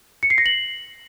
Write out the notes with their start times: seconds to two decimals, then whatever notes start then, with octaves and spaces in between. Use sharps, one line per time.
0.23 C#7
0.30 C7
0.38 A#6
0.46 F#7